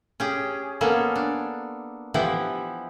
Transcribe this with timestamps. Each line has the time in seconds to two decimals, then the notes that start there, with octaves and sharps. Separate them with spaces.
0.20 C#4 G4 G#4
0.81 A#3 B3 C#4 A4
1.16 D4
2.14 E3 F3 B3 E4 G4